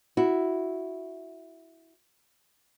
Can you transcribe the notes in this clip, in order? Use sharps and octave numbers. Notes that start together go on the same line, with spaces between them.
E4 F#4